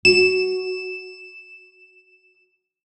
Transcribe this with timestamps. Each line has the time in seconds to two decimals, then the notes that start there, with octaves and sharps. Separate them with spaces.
0.05 F#4 E7